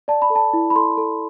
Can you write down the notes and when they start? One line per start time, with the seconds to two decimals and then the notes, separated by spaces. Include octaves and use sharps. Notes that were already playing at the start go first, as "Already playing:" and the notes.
0.08 D5 A5
0.22 B5
0.30 A4
0.35 A5
0.53 E4
0.70 B5
0.76 A4 C6
0.98 A4